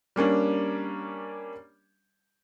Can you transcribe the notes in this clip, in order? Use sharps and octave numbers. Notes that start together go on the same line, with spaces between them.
G3 A#3 C#4 D4